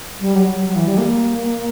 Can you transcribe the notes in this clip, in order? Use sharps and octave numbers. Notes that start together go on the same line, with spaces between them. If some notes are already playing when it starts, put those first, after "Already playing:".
G3
F#3
F#3
F#3
E3
G3
A#3